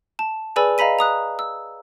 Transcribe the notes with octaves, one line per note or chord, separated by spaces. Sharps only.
A5
G#4 B4 D5 G#5 B5 E6
D#5 F5 A#5 B5 B6 D#7
A#5 D#6 F#6
E6